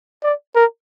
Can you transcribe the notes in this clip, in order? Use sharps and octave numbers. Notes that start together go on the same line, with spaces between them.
D5
A#4